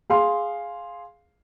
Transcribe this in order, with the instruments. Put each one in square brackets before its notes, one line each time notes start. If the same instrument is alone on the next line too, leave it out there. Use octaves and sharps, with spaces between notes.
[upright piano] G#4 F5 C6